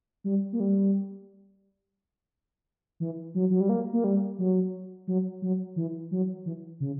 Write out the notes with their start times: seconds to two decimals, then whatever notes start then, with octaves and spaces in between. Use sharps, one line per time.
0.24 G3
0.53 A#3
0.60 G3
3.00 E3
3.35 F#3
3.50 F#3
3.60 G3
3.69 A#3
3.93 A#3
4.04 G3
4.39 F#3
5.08 F#3
5.42 F#3
5.76 E3
6.11 F#3
6.46 E3
6.80 C#3